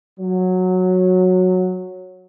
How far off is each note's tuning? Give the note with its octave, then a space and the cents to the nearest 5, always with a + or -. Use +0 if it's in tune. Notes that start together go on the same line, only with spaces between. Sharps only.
F#3 -10